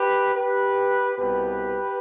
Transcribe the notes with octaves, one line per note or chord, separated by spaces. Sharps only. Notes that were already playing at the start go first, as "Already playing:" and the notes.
Already playing: G4 B4
G4 B4
C2 B2 G4 B4